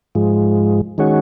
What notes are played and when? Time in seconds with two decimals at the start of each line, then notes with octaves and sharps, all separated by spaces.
0.15 G#2 F3 G#3
0.98 D#3 G#3 C#4 F#4